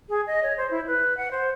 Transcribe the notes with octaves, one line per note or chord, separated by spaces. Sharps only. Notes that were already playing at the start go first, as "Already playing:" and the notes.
G#4
D#5
C#5
C5
E4
B4
F#5
C5